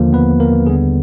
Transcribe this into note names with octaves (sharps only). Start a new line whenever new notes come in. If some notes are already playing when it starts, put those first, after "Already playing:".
Already playing: D#2 D3 F3 A#3
B3 B4
A#3 A#4
D#2 D3 G3 B3 G#4